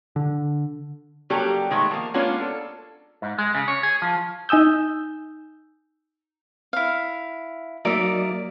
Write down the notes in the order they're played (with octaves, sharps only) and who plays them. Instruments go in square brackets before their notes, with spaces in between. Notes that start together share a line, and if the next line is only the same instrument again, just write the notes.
[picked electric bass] D3
[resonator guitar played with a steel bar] C#3 F#3 G3 A#3 G4 A4
D#3 G#3 A3 B3
F3 A#3
G#3 A#3 B3 C#4 D4 F4
A4
[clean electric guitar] G#2
G#3
C#3
C#5
G#4
F3
[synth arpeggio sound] D#4 G#5 D#6 E6 G6
[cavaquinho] E4 F5
[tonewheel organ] F#3 [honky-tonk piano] A#3 D5 D7 [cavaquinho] D#4 E5